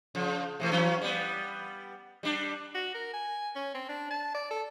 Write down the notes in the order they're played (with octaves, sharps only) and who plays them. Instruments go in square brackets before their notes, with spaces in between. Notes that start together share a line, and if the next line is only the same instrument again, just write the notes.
[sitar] C#3 F3
C3 E3 A3
E3 F#3 C#4
G3 B3
G3 D4
[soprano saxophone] F#4
A#4
G#5
C#4
C4
D4
A5
D5
A4